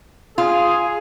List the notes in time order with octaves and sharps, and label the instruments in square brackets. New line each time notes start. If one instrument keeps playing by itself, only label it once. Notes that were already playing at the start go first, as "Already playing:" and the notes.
[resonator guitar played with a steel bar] F4 [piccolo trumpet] G#4